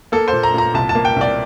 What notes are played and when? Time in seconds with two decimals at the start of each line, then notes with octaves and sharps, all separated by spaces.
0.12 A#3 A4
0.28 A#2 C5
0.43 A#5
0.54 A#2 A#5
0.74 C2 A5
0.89 A5
0.95 A#3
1.05 G5
1.16 C2 D5